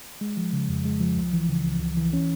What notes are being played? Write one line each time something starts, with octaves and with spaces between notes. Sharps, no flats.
G#3
F3
C#3
F2
G#3
F3
C#2
E3
C#3
C#2
C#2
E3
C#4